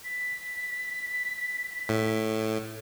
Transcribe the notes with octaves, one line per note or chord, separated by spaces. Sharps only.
B6
A2